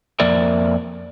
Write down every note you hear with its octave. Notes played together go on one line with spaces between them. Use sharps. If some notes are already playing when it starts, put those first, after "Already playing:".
F2 A#3 A#4 D5 E5